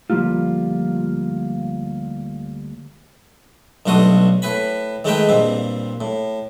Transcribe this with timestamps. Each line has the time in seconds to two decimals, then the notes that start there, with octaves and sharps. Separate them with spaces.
0.10 D2 F3 G3 A#3 F4
3.86 B1 G2 A3 F#4 C6 D#6
4.42 A2 B4 G#5 B5
5.04 D#3 G#3 A3 D#4 B4 G5
5.29 G2 A#2 C4
6.01 A2